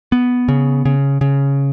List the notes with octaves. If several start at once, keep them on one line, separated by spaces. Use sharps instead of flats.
B3
C#3
C#3
C#3